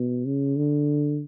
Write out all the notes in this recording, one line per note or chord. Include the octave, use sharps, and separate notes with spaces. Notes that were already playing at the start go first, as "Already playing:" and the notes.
Already playing: B2
C#3
D3